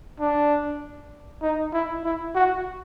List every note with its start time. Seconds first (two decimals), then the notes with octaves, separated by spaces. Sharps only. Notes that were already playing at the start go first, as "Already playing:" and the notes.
0.20 D4
1.42 D#4
1.73 E4
2.04 E4
2.35 F#4